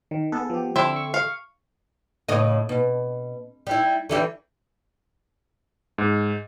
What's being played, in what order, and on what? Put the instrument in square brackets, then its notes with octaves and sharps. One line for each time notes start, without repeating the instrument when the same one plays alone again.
[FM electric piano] D#3
[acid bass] B3 [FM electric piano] G#4 A4
[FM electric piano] F3 G4
[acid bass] D3 [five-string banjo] C4 E4
[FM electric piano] C#6
[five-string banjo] F5
[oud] A2 C#3 D#5
B2
G3 E4
D3 E3 G3
[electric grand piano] G#2